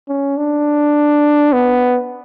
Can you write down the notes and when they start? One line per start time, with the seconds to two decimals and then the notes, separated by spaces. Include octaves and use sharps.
0.08 C#4
0.37 D4
1.53 B3